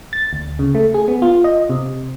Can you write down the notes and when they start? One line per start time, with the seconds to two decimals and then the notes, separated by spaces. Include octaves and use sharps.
0.13 A6
0.33 D2
0.59 C#3
0.75 A3
0.94 G#4
1.08 B3
1.22 F4
1.44 D#5
1.70 C3